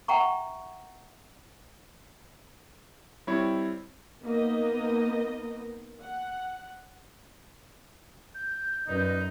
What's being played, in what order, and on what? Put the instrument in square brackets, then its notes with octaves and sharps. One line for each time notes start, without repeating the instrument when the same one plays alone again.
[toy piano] E5 F#5 G5 A#5 C#6
[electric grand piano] G3 C4 E4 C#5
[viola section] A#3 B3 D#4 D#5
F#5
[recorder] G6
[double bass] F#2 [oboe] D#4 [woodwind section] B4 D5 D#5